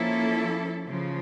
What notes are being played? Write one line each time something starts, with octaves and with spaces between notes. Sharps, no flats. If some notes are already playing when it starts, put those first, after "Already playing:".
Already playing: F3 A#3 C#4 E4 A4
C#3 F3